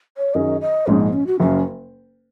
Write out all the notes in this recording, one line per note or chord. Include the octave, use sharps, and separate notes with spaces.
C#5
F#2 D#3 F#3 C#4 G#4 D#5
D#5
A#1 G#2 G#3 C#4
A#3
C#4
F#4
F#1 F#2 C#3 C#4